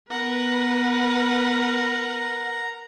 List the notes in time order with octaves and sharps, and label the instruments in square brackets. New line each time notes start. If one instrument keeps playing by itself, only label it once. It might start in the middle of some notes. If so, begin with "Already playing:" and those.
[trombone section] B3 [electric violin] A#4 F#5 [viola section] B4 [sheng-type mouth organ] A#5